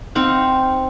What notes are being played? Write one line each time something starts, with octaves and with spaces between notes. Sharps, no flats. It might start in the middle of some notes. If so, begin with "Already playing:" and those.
C4 D#4 F5 F#5